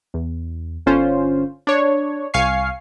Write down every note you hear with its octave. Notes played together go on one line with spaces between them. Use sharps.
E2
G1 D3 C#4 F4 C5
D4 C#5
C2 F5 G#5 C#6 C7